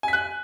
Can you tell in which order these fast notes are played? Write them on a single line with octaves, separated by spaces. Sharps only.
G#5 B6 F#6